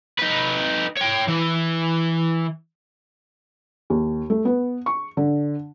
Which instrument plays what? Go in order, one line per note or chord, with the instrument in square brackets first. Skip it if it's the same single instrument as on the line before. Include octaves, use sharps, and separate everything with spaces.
[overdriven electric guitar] D#4 B4
C#5 G5
E3
[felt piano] D#2
A3
B3
C#6
D3